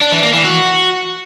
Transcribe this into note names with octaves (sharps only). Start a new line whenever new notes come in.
D4
E3
A#3
E3
F#4